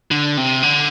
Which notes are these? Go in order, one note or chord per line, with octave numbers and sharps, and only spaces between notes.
D3
C3
D3